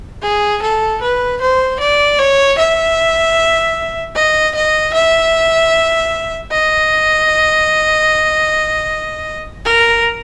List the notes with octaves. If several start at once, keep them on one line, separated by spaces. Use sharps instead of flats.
G#4
A4
B4
C5
D5
C#5
E5
D#5
D#5
E5
D#5
A#4